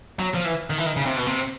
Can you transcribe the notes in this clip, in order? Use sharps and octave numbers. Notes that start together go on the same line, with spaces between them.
F#3
F3
E3
D#3
E3
D#3
C#3
C3
B2
C3